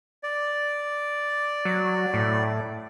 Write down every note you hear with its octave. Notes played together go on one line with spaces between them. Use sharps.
D5
F#3
A2